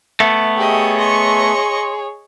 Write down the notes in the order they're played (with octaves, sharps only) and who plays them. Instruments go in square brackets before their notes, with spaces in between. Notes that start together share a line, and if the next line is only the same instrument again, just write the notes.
[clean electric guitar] A3 B3 [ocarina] E5
[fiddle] G4 D#5 [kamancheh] G#4 C#5
[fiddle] D#5 C#6 [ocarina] C6